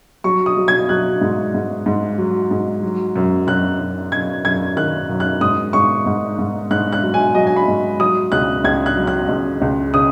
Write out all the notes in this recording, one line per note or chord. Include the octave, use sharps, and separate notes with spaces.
F#3 C#6
D#6
F#3
G#6
F#3 F#6
G#2
G#2
G#2
F#3
G#2
F#3
F#2
F#2 F#6
F#2
F#2 G#6
F#2 G#6
D#3 F#6
F#2
F#6
G#2 D#6
G#2 C#6
G#2
G#2
G#2 F#6
F#6
F#3
G#5
F#3 D#5
G#5
B5
G#2
F#3 D#6
C#2 F#6
C#2 G#6
F#6
F#3
F#6
C#2
C#2
C#3 D#6